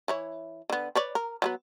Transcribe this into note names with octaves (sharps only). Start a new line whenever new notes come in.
E3 E4 C#5
D3 B3
B4 C#5 D5
A#4
F#3 G3 B3